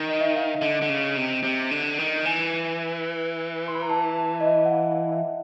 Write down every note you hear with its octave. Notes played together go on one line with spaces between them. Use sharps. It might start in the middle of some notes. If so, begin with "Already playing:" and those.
Already playing: D#3
D#5
E5
F5
E5
D3 D#5
D3
C#3
C3
C3
D3
D#3
E3 G#5
C6
B5
A#5
A5
A5
D#5
E5
F#5
F5
F5
E5